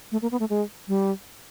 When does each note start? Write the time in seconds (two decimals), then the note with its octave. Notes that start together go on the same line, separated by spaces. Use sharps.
0.12 A3
0.22 A#3
0.32 B3
0.40 A3
0.50 G#3
0.88 G3